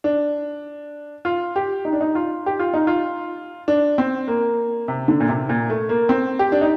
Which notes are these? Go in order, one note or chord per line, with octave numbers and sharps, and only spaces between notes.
D4
F4
G4
D#4
D4
D#4
F4
G4
F4
D#4
F4
D4
C4
A#3
C3
D3
A#2
C3
A#2
A3
A#3
C4
G4
D4
D#4